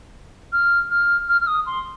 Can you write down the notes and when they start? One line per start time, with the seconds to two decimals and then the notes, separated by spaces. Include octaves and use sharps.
0.52 F6
0.90 F6
1.29 F6
1.41 F6
1.47 D#6
1.66 C6